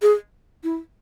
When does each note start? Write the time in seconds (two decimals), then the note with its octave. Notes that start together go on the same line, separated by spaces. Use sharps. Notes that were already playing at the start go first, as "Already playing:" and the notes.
0.02 G#4
0.64 E4